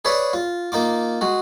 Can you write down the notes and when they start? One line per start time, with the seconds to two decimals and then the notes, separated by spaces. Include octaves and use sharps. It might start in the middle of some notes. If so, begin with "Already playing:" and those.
0.05 G#4 B4 C#5 D5 E5
0.33 F4
0.72 A#3 D#4 F4 D6
1.21 G#3 F#4